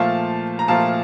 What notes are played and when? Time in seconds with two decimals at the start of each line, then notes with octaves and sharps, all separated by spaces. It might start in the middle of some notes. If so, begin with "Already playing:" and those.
Already playing: A#2 F3 A3 F5 A5
0.59 A#5
0.68 A#2 F3 A3 F5 A5